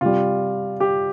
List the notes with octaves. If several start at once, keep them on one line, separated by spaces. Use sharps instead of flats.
C3 G3 F4
G4